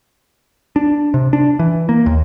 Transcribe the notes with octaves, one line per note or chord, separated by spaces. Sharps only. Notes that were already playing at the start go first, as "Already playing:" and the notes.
D4
C3
D4
E3
A#3
D#2